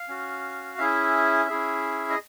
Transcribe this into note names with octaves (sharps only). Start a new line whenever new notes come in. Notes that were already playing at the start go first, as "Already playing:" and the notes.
Already playing: F5
C#4 F#4
C#4 E4 G#4 E5
C#4 E4 G#4
D#5